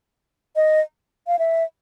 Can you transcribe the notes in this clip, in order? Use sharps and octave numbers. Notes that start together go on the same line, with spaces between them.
D#5
F5
E5